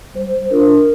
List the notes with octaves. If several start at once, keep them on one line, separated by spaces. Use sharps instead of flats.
G3 C5
D4 F4 A#4